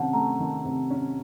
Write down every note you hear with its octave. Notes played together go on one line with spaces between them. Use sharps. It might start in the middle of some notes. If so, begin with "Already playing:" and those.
Already playing: C3 D#3 C#4 F#5 A5
A3 A#5
D#3
C3
C#4